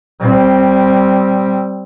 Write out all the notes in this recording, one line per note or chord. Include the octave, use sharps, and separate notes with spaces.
G3 C4